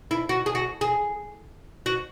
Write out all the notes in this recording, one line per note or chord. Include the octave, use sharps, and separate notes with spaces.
E4
F#4
G#4
F#4
G#4
F#4